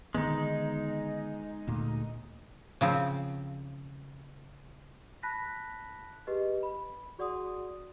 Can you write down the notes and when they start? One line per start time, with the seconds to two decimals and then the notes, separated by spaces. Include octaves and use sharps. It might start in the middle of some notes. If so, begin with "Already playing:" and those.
0.15 D3 D#3 G#3 B3 D#4
1.68 D2 A#2
2.81 C#3 F3 C4
5.23 A5 B5 F#6 A#6 B6
6.27 G4 G#4 B4 D#5
6.63 B5
7.18 F#4 G#4 D5 F#5 C6 D#6